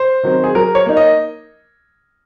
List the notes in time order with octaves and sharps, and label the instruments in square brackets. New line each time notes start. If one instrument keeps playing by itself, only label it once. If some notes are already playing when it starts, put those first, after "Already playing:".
Already playing: [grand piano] C5
[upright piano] D#3 F#3 C4
[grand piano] G#4
[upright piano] F#3 [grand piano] A#4
[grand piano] C#5
[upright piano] A#3 D#4
[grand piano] D#5